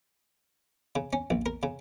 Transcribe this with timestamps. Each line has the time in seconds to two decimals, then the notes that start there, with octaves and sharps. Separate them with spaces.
0.96 C#3
1.13 C#4
1.30 A#1
1.46 A#4
1.63 C#3